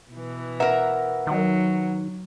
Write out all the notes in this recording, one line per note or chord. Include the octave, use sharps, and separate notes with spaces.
B2 E3
A#4 B4 E5 F#5 A#5
D#3 F#3